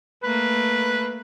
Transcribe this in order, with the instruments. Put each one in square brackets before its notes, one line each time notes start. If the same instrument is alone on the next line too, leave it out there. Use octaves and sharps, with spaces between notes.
[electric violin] A3 A#3 [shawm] B4